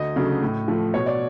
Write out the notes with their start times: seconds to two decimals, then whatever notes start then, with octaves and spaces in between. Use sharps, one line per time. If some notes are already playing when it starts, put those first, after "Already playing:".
Already playing: D2 D#5
0.16 C#3 F#3 A3 D4
0.42 A2
0.68 F3 A3
0.94 B2 C#5
1.06 D5